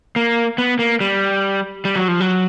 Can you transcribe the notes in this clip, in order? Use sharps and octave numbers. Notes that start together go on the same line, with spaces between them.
A#3
B3
A#3
G3
G3
F#3
F3
F#3